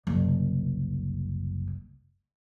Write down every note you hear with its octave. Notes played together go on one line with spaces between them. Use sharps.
F#1 C2